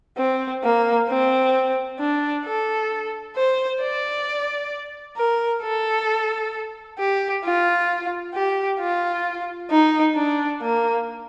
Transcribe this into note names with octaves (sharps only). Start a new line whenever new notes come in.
C4
A#3
C4
D4
A4
C5
D5
A#4
A4
G4
F4
G4
F4
D#4
D4
A#3